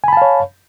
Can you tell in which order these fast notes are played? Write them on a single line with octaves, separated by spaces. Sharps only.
G#5 B5 A5 F5 C#5